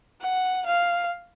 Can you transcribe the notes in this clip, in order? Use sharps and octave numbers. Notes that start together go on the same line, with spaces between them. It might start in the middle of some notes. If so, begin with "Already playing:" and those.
F#5
F5